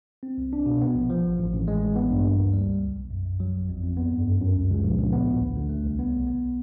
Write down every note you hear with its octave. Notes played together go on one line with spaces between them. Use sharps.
C4
C2
D4
B2
B3
A#1
F3
G#1
A1
A1
G#3
A1
B3
G2
A#3
D2
G3
C#2
B1
B1
F#2
F#2
F#3
A1
F2
F2
B3
G2
F#2
F#2
C#2
C#2
A#1
A#1
B3
A2
D2
D2
A3
C2
B3
B1
B3